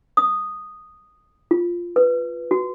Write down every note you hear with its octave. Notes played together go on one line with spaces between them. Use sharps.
D#6
F4
B4
F#4